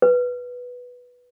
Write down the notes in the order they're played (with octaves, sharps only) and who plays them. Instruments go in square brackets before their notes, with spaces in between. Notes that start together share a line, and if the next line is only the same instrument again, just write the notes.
[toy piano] B4